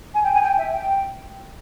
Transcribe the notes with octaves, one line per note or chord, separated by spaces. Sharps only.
G#5
G5
G#5
G5
E5
G5